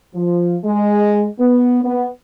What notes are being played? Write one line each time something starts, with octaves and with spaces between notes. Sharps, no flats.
F3
G#3
B3
B3